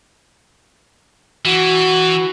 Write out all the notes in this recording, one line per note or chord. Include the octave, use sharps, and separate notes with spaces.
E3 F#4